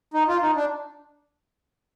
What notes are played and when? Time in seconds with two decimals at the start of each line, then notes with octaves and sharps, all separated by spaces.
0.14 D#4
0.28 F4
0.42 D#4
0.56 D4